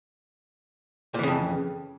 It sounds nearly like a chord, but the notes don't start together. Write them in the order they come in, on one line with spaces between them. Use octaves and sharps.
A#2 E3 C#3 F2